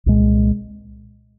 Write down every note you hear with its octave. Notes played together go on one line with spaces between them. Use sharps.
C2 A#2 G#3